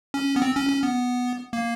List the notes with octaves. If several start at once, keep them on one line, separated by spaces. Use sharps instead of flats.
C#4
B3
C4
C#4
C#4
B3
A#3